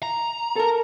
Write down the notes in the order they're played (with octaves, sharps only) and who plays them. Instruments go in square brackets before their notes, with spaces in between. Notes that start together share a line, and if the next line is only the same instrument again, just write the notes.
[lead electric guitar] A#5
[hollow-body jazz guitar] A4 A#4